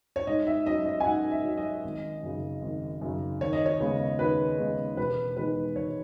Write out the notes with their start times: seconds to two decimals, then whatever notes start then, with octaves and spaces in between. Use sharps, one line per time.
0.16 C#5
0.27 G#2 D#5
0.47 E5
0.66 F#3 C#4 D#5
0.86 D#5
1.00 G#5
1.05 G#2 F#5
1.31 E5
1.45 F#3 C#4
1.57 D#5
1.84 G#1
2.23 F#2 C#3
2.62 G#1
3.01 F#2 C#3
3.41 D#2 C#5
3.53 D#5
3.66 C#5
3.80 C#3 G#3 B3
4.19 D#2 B4
4.58 C#3 G#3 B3
4.97 E1 B4
5.37 E2 D#3 G#3 B4
5.76 E1 C#5